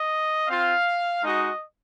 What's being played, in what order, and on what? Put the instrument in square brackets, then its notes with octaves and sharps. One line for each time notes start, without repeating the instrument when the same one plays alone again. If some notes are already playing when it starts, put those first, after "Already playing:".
Already playing: [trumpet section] D#5
C4 F4 F5
G#3 D#4 F#4 D#5